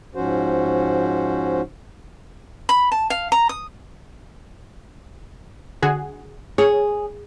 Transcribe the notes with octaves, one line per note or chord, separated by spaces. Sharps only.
G#2 F3 C#4 F#4 C5
B5
A5
F5
A#5
D#6
D3 F#4 G#4
G#4 C#5